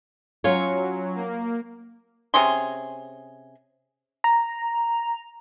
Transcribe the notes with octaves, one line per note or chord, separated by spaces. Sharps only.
F#3 C#4 F4 C#5
A#3
C3 C#4 G#4 C6
A#5